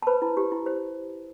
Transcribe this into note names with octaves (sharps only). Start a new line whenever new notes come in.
A5
B4 C5 B5
E4
G4
E4
C5